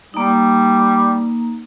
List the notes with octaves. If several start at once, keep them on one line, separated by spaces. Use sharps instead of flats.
G3 A#3 D#4